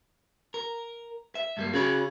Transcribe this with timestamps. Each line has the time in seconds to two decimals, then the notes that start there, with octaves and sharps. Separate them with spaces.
0.54 A#4
1.35 E5
1.57 G2 G3 A#3
1.74 C#3 F#4 C#5 B5